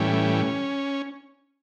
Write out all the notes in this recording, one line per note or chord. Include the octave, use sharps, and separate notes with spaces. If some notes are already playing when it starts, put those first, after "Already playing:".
Already playing: A2 E3 G3 C#4